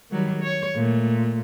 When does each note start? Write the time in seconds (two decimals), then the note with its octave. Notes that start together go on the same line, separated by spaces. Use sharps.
0.11 D#3 F#3 G3
0.42 C#5
0.76 A#2 A3